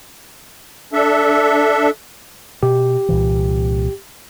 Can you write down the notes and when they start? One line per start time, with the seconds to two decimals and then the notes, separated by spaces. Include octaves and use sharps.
0.93 D4 A4 E5
2.63 B2 G4
3.09 C2 A#2 E3